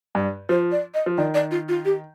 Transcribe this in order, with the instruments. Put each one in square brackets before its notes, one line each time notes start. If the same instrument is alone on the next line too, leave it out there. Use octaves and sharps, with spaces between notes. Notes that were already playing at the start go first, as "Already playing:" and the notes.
[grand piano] G2 [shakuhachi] D5
[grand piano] F3 [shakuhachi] C5
[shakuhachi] D5
D#5
[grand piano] F3
[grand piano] D#3 [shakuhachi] D5
[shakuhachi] D5
F4
F4
G4